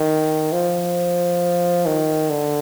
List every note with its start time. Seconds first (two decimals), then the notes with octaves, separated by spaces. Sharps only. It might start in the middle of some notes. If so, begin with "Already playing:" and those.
Already playing: D#3
0.52 F3
1.86 D#3
2.30 D3